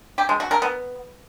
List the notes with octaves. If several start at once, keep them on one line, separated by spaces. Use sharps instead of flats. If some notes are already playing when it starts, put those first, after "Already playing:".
G4
G#3
F#4
A#4
B3